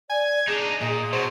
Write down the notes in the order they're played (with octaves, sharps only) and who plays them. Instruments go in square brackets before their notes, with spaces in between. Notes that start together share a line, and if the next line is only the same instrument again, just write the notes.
[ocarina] D5 [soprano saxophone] G#5
[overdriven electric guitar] D4 D#4 [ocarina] G#4
[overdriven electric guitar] A#2 [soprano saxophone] D#5
[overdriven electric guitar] B2 F#3 [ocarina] G#4 [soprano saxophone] C5